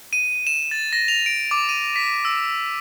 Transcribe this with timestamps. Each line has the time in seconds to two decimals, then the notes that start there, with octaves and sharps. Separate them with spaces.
0.13 D#7
0.47 E7
0.71 A6
0.93 A#6
1.08 F7
1.26 D7
1.51 D6
1.69 D#7
1.96 B6
2.25 E6